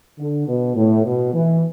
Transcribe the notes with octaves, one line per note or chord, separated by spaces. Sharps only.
D3
B2
A2
B2
E3